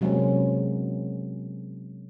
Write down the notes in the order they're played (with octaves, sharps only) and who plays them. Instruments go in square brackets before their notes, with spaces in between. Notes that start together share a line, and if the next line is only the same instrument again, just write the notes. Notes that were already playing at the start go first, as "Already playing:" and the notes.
[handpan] C3 F#3 G#3 A#3 C4 C#4